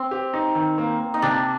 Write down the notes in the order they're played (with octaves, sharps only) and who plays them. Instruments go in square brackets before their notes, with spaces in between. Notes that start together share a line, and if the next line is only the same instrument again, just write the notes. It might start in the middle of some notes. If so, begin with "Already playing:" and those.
Already playing: [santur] C4
[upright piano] G4
D#4
D#3
A#3
A#3
[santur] D#4
[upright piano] C3 [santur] D4